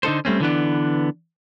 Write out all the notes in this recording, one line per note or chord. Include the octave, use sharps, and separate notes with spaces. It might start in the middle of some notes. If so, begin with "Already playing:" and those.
D3 D#4 A4 C5
G3 A3 C4 C#4
D3 E3 B3 D4